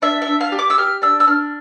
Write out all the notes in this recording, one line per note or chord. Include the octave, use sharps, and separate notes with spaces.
D4 E5
E5
D4
F5
G4
D6
E6
G4 F6
D4 E6
E6
D4 F6